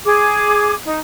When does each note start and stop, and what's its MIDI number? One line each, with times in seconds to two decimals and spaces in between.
0.06 0.74 68
0.06 0.74 86
0.86 0.99 63